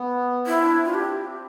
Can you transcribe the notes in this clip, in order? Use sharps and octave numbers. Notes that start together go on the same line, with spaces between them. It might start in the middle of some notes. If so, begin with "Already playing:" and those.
Already playing: B3
C4 E4
D4
C4
D4 F4
G4
C4